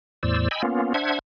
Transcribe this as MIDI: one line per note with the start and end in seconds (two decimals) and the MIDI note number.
0.23 0.48 40
0.23 0.48 45
0.23 0.48 72
0.23 0.48 74
0.23 0.48 88
0.51 0.62 75
0.51 0.62 79
0.51 0.62 80
0.51 0.62 83
0.51 0.62 88
0.63 0.93 58
0.63 0.93 59
0.63 0.93 61
0.63 0.93 65
0.94 1.19 62
0.94 1.19 72
0.94 1.19 76
0.94 1.19 78
0.94 1.19 92